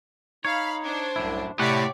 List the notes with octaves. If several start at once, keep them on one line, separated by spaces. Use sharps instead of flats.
D#4 C#5 F5 B5
D4 C5
C2 F#2 A2 E4
A2 C3 G4 C#5 D5 F#5 B6